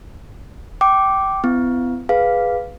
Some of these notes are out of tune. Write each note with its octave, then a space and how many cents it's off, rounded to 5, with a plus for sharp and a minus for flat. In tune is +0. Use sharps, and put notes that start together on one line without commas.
G5 -20 D6 +0
B3 +35 E4 +45
G#4 +0 B4 +0 F5 +0